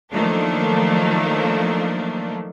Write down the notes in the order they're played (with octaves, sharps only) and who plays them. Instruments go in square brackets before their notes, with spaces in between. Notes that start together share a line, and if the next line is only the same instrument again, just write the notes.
[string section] D#3 F3 F#3 A3 A#3 D4